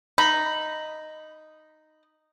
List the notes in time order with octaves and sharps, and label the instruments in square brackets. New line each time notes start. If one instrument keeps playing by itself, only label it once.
[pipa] D#4 [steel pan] B5